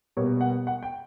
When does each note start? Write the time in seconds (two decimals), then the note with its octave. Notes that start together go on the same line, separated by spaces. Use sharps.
0.17 B2 G3 A#3 C#5
0.41 F#5
0.67 F#5
0.83 G5